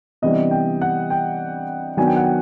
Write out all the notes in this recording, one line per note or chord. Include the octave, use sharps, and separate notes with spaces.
C3 E3 G3 B3 D4 D#5
G5
F#5
G5
D#3 F#3 B3 D4 G#5
G5
F#5
G5